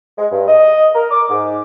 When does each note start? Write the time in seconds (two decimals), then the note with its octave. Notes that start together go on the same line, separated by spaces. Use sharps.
0.18 G#3
0.32 G2
0.48 D#5
0.95 A#4
1.11 D6
1.30 G#2